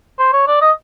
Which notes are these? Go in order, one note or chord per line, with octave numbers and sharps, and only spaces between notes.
C5
C#5
D5
D#5